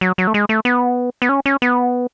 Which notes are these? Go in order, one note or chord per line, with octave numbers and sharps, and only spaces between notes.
F#3
F#3
A3
G#3
A3
B3
B3
C#4
C#4
B3